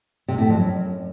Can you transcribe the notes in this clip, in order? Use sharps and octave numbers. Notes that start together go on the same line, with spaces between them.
C3
A2
F2
F#2